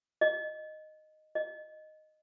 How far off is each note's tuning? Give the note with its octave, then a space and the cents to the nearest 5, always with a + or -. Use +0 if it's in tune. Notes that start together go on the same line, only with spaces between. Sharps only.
D#5 -5
D#5 -5